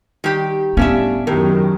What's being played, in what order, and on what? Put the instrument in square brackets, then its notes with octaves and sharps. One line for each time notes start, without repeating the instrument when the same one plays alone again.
[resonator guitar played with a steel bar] D#3 G4 [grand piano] G3
[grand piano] A2 G3 F5 [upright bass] B3 [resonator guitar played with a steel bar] C#4 D4 E5
[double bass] F#2 D#3 [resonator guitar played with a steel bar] A2 [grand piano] G4 A#4